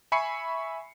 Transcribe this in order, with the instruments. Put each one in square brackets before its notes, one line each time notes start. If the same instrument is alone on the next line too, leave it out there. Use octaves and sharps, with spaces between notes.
[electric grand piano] E5 G#5 B5 C#6 C7 C#7